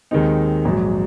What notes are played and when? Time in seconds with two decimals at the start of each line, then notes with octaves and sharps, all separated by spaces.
0.11 D#2 D#3 G#3 C4 D#4
0.64 A#1 G#2 F#3